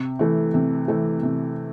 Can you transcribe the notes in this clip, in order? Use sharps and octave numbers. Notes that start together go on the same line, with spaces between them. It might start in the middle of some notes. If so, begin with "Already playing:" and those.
Already playing: C3
E3 A3
C3
E3 A3
C3